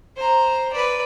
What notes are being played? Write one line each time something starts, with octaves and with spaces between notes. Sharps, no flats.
C5 A#5
B4 D5